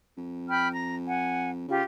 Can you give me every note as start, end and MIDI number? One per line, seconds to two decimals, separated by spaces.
0.17 1.67 41
0.49 0.68 79
0.49 0.68 83
0.49 0.68 89
0.71 0.95 82
1.07 1.49 78
1.07 1.49 80
1.68 1.82 49
1.68 1.82 65
1.68 1.82 67